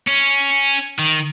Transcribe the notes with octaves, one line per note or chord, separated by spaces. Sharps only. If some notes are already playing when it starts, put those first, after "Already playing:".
C#4
D#3